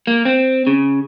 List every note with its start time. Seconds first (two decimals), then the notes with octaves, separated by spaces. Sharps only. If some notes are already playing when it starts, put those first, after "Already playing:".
0.07 A#3
0.25 C4
0.67 C#3